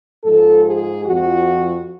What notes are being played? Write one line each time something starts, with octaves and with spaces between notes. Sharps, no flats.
G#2 F3 A4
G#4
F2 F3 F#4